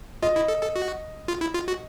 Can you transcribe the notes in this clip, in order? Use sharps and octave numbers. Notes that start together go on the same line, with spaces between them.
F4 D#5
E4
A4
A4
F#4
F4
E4
F4
F#4